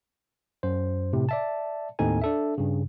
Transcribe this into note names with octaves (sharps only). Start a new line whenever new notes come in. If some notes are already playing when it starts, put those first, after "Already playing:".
F#2 C5
A2 C3
D5 E5 A5
D#2 A2 C4 D#4 A4 G#5
D4 A4 E5
G2 C#3